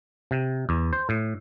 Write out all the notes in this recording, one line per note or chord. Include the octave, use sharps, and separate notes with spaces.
C3
E2
C5
A2